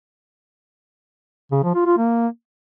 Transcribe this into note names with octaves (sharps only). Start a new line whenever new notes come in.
C#3
F3
F4
F4
A#3